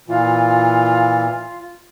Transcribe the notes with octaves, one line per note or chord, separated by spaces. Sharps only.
A#2 E3 F4